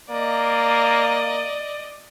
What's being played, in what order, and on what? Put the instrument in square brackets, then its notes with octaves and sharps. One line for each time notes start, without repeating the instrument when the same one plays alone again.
[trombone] A#3 [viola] D5 D#5